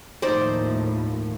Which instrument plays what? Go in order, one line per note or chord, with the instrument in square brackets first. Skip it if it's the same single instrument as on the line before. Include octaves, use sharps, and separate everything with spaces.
[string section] D#2 A2 F3 [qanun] D#4 C5 D5